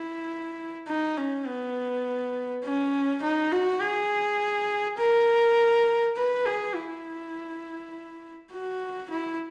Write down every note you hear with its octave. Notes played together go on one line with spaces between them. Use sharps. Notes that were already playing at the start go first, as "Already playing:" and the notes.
Already playing: E4
D#4
C#4
B3
C#4
D#4
F#4
G#4
A#4
B4
G#4
E4
F#4
E4